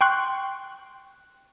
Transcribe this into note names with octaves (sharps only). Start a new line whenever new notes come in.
G5 C6 C#6 F#6